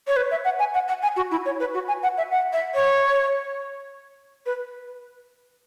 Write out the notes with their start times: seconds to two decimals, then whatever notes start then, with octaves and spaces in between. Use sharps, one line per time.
0.07 C#5
0.16 B4
0.31 E5
0.45 F#5
0.59 G#5
0.74 F#5
0.88 F#5
1.02 G#5
1.16 F#4
1.31 E4
1.46 C#5
1.60 B4
1.74 F#4
1.88 G#5
2.03 F#5
2.17 E5
2.31 F#5
2.53 E5
2.75 C#5
4.46 B4